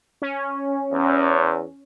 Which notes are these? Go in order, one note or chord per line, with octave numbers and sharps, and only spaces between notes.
C#4
E2